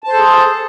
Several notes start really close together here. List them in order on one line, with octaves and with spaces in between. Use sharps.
A5 C5 A4 G#4